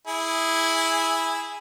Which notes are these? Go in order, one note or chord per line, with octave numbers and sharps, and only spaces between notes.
E4 G#4